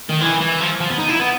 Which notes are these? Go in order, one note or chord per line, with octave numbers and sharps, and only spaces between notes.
D#3
E3
E3
F3
F3
B3
D#4
E4
B3